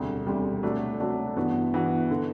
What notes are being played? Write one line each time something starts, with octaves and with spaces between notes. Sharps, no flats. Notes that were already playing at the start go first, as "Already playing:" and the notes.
Already playing: E1 D2 C3 G3
E1 D2 C3 G3
C3 F#3 A3 D4 F#4
C3 F#3 A3 D4 F#4
G2 E3 B3 F#4
G2 E3 B3 F#4
D3